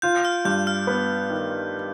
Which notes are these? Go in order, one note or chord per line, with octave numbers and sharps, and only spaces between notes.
F4 G6
F6
G2 G6
F6
B3
D#3